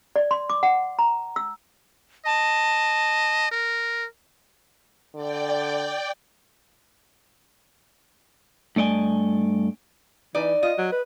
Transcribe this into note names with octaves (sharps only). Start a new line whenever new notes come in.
D5
C6
D6
F#5
A#5
E6
D#5 A5
A#4
D3 D5 G5
G2 A3 D5 D#5 G#5
E3 D#4 D5
F4 D#5
F#3
B4